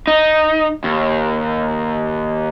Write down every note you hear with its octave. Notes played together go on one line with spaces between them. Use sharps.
D#4
D#2